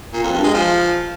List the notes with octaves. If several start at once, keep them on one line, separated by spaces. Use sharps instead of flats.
A#2
F2
G2
G#3
F3